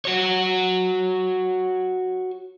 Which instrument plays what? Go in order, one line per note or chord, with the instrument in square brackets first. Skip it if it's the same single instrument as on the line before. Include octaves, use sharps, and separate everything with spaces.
[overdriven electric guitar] F#4 C#5